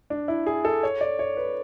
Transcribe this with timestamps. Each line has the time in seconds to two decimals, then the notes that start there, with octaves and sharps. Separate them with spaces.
0.10 D4
0.28 E4
0.46 G#4
0.65 A4
0.83 C#5
1.01 D5
1.19 C#5
1.37 B4